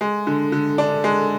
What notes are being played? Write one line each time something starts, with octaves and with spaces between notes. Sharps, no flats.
G#3
D3
D3
D4
G#3